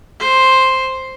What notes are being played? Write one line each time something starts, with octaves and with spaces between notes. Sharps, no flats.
C5